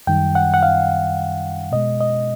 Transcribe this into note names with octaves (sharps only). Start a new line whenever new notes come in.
F#2 D#3 G3 G5
F#5
F#5
F5
B2 G#3 D#5
D#5